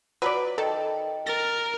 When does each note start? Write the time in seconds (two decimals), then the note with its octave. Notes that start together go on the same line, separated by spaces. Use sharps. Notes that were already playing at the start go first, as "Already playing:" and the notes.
0.22 F#3 G#4 B4 D5
0.58 D#3 A4 D#5 G5
1.27 A#4 A6 A#6